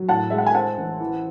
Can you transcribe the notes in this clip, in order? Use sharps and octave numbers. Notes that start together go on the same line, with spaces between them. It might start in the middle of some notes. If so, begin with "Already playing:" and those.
Already playing: F#3
A2 F#5 A5
G#3 E5
F#5
G#5
C4 F#5 A5
A1
E3